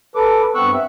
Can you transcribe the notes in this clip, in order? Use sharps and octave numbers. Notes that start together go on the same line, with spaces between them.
A4 B4 D6
G2 B3 C4 C#6 E6 F#6
E5